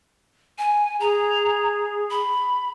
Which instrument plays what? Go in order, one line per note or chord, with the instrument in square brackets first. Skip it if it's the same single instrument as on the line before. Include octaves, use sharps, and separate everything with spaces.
[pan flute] G#5
[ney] G#4 [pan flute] A#5
[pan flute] B5